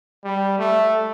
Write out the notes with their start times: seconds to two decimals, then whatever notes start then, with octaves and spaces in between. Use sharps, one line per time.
0.24 G3
0.59 A3